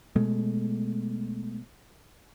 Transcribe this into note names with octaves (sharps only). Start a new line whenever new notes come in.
B2 G#3 A3